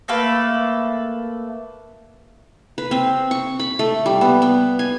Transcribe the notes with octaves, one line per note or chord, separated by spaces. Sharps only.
A3 A#3 A4 B4
B4
C4
C#6
B5
A3
G3
B3
B3
G#5